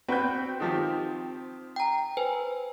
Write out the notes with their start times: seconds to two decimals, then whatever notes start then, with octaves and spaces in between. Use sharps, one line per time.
0.08 C4 F#4 B4 G5 G6
0.60 D#3 F3 G4
1.76 G5 A#5
2.17 B4 C5 G#5